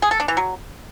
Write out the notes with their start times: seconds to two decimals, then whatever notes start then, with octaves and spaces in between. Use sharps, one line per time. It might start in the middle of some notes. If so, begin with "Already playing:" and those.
0.02 G#4
0.11 A4
0.20 D4
0.28 E3
0.37 F#3